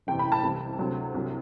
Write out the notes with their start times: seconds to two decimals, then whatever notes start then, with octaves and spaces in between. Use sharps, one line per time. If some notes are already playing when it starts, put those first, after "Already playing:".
0.07 F#1 E2 C3 E3 G5
0.19 B5
0.32 A5
0.43 C2 C3 E3
0.79 D2 C3 F#3
1.14 C2 C3 F#3